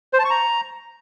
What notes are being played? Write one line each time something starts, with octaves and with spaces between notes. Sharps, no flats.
C5
A5
C#6
A#5